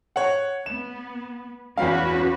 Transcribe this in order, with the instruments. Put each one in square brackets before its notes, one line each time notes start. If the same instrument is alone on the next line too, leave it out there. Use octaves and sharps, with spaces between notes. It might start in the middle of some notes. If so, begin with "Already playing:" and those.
[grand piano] C#5 F#5
[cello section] B3 [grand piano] E7
[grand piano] E2 F5 [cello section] C#4 F#4 B4